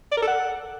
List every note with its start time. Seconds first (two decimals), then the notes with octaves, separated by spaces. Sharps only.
0.12 D5
0.17 A#4
0.22 A4
0.28 F#5